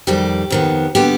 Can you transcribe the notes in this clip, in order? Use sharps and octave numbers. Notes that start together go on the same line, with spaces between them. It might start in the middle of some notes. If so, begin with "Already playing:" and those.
F2 D#3 G3 G4
F2 D#3 B3
D3 G3 B3 G4